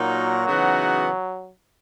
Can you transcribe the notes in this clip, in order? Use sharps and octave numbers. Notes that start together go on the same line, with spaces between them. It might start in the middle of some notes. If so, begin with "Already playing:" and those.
Already playing: A#2 F#3 A#3 D#4 F#4 A#4
C#3 E3 B3 D#4 F#4